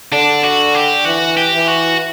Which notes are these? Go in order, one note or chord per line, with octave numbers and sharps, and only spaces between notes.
D3 D4
F#4
G4
E3 F#4
G4
E3
F#4